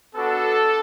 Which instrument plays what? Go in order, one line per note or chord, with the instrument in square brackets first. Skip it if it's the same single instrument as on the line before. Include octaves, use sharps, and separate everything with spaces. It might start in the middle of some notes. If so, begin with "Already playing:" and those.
[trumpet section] B3 D4 F#4 A4